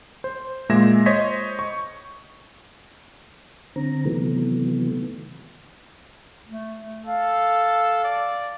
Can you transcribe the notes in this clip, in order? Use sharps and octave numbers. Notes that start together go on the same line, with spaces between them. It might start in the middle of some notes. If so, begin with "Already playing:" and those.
C5
A#2 G#3 E5 G#6 A#6 E7
C5 C#5 D#5 G#6 B6
C#6
D3 C4 A#5
C3 D#3 E3 F#3 A3 B3
A3
A4 F5
D5